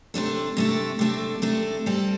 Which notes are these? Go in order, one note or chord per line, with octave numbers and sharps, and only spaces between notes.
C3 A3 D4 A4
C3 A3 D4 A4
C3 A3 D4 A4
C3 A3 D4 A4
G3 C4 A4